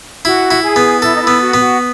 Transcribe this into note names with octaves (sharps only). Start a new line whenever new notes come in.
E4 F#4
E4
G#4
B3
E4 A4
D#4
E4
B3
F#4
B3
F#4